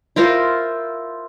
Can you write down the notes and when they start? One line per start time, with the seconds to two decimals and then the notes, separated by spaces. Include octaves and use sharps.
0.16 E4 F4 A#4 C5